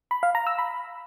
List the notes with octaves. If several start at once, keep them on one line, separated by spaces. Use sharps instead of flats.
B5
F5
A#5
E6
B5